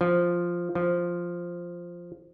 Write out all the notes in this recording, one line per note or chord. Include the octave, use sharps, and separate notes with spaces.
F3
F3